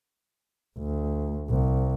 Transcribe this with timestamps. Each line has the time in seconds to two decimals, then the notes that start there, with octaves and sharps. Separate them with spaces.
0.78 D2
1.49 C2